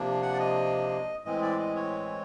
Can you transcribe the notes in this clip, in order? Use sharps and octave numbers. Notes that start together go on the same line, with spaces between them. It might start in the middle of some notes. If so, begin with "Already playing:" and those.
Already playing: C3 F3 A#3 D4
F#5
D5
D#5
A2 E3 G#3 C4 D#5
D5
D#5
C#5